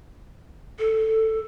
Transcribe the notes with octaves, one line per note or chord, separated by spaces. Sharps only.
A4